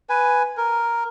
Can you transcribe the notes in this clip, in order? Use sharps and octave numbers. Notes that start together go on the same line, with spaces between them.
B4 G#5
A#4